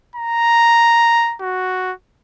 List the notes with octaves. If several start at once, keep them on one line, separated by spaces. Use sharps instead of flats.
A#5
F#4